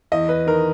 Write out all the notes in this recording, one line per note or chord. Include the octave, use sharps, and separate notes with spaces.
E2 D#5
E2 B4
D#3 A#4